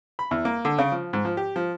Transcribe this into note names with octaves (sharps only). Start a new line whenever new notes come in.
B5
E2
A#3
D3
C#3
F3
G#2
F3
G4
F3